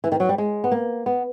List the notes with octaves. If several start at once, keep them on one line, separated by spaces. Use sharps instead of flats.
E3
D#3
F#3
G3
G#3
B3
A#3
B3